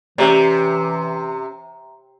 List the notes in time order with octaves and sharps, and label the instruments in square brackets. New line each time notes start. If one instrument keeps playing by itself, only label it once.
[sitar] C3 [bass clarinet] E3 [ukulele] C#4 G4 D5 [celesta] E5 A#5